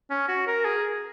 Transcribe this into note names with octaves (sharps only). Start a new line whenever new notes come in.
C#4
F#4
A#4
G#4